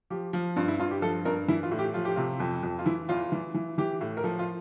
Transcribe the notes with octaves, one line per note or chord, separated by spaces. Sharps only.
F3 G4
F3
G2 F4
E4
G2 F4
G4
F3 A4
G2 A#4
E3 E4
F4
A2
G4
F3 F4
G4
C3 F4
F2
F2
F4
E3 E4
E2 F4
E3
E3
E3 G4
A2
A#4
F3 A4
F4